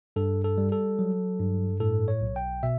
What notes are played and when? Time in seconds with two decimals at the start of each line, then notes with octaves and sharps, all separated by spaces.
0.16 G2 A4
0.44 A4
0.58 G3
0.72 A4
0.99 F#3
1.39 G2
1.80 A2 A4
2.08 C#5
2.21 B1
2.36 G5
2.63 B2 E5